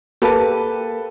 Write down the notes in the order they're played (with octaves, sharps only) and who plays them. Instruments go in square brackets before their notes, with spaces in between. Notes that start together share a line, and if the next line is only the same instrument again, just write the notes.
[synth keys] A#3 G4 [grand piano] A4 B4 A5